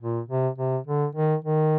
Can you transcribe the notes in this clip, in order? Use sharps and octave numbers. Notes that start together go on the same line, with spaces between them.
A#2
C3
C3
D3
D#3
D#3